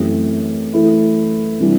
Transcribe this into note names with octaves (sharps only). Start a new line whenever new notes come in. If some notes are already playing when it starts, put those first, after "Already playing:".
Already playing: F#2 E3 A3 C4 G4
E3 A3 E4
C3 E3 G3 D4